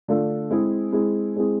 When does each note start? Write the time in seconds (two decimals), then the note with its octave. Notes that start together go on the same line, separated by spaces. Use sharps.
0.08 D3 A3 D4 F4 A4
0.50 G#3 C4 E4 G#4
0.92 G#3 C4 E4 G#4
1.36 G#3 C4 E4 G#4